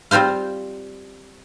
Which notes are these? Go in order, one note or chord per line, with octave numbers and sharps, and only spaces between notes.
G3 C4 F4 C5 F5